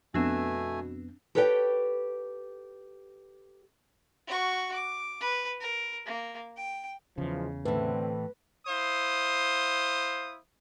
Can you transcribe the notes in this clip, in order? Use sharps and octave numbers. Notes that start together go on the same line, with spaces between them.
F2 B2 A3 B3 C4 D4 G#5 E7
G4 A4 B4 C#5 E5 G5
F#4 C#6
D6
B4
A#4
A#3
G5
E2 C#3 E3 F3 G#3
A2 D3 E3 C4 B4
E4 C5 F5 D#6